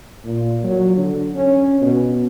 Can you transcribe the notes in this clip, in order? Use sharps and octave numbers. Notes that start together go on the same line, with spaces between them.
A#2
F#3
D3
C#4
B2